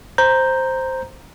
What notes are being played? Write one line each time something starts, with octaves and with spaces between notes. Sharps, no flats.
C5 A#5 G6